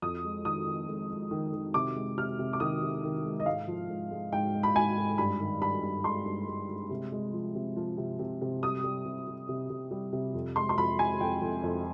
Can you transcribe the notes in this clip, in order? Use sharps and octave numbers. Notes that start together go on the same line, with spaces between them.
F2 D#6
G#3
D#3 D#6
D#3
G#3
G#3
D#3
D#3
C3 D6
G#3
C3 F6
C3
D6
D#3 D#6
C3
D#3
G#3
D#5
G#2 F5
F3
G#2
G#3
G#2 G5
G#3
B5
G#2 G#5
G#2
G2 B5
D#3
G2 B5
G2
G#3 C6
G2
G#3
G#3
C3
G#3
F3
C3
F3
C3
C3
C3
G3 D#6
G3
C3
C3
C3
C3
G3
C3
F2
G#3 C6
C6
F2 B5
G#3 G#5
F2 G5
F2
F2